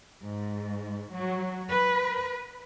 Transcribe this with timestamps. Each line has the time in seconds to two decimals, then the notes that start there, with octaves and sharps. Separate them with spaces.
0.24 G#2
1.12 F#3
1.69 B4